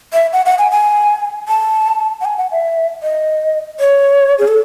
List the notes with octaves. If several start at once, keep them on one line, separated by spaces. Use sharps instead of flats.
E5
F#5
F#5
G#5
G#5
A5
F#5
G#5
F#5
E5
D#5
C#5
G#4
A4